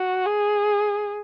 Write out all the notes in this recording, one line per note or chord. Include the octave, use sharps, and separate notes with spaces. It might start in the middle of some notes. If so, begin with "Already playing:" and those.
Already playing: F#4
G#4